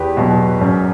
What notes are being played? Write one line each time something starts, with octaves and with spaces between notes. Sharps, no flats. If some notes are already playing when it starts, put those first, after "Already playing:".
Already playing: E2 G4 B4
B2 F#3
F#2